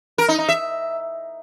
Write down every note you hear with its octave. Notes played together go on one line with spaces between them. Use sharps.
A#4
D#4
D#4
E5